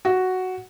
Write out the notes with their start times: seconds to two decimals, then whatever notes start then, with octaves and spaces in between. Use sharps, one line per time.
0.05 F#4